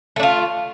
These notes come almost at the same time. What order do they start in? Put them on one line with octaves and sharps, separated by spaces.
A3 D4 F4